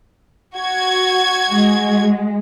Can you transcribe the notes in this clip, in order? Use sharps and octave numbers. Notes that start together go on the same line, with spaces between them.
F#4 G#6
G#3